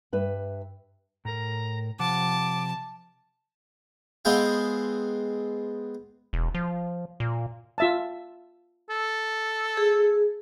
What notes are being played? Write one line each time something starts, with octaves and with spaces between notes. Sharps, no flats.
G2 B4 E5
A2 A#4 A#5
C3 F3 F#5 A5 D6
G#3 B3 C4 G#4 F5 G5
E1
F3
A#2
F4 E5 A5
A4
G#4